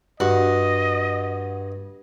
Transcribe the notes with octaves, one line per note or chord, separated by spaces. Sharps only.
G2 F#4 D#5